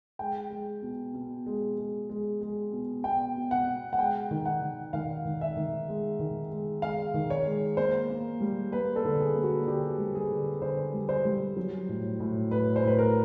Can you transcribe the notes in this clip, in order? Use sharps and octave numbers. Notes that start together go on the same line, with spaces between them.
G#3 G5
G#3
B2
B2
G#3
G#3
G#3
G#3
B2
B2 G5
B2
F#5
B2
F#5
G#3 G5
D#3
F#5
D#3
D#3 F5
D#3
E5
D#3
G#3
D#3
G#3
G#3 F5
D#3
C#5
G#3
A#3 C5
A#3
G3
A#3 B4
A4
D3
G#4
A#3
F#4
D3 G4
G3
G#4
D3
D3 C5
G3
C5
G3
F#3
A2
A2
A2 B4
C5
A2 B4
A#4